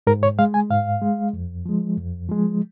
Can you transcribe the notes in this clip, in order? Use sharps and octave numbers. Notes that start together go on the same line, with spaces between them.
G#2 A#4
C#5
G#3 F5
G#5
G#2 F5
G#3
F2
F3 G#3
F2
F3 G#3